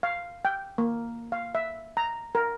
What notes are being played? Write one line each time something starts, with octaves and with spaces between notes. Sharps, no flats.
F5
G5
A#3
F5
E5
A#5
A#4